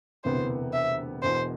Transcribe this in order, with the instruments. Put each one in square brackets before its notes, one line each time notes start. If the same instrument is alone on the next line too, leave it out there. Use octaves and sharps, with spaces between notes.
[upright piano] E1 D2 C3 E3 B3 [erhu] C5
[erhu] E5
[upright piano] E1 E2 B2 [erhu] C5